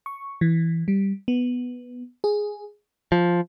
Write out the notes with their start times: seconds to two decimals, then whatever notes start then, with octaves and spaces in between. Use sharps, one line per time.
0.06 C#6
0.41 E3
0.88 G3
1.28 B3
2.24 G#4
3.12 F3